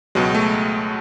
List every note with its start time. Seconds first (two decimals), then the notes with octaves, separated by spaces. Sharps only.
0.15 C#2 B2 F#3 G#3
0.35 A3